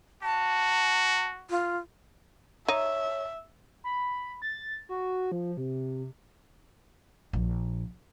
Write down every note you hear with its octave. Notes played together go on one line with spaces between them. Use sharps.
F#4 A5
F4
D#4 C#5 E5
B5
A6
F#4
F3
C3
A#1